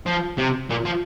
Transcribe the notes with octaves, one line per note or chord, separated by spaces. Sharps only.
F3
C3
A#2
F3